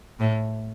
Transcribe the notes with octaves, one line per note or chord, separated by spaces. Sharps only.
A2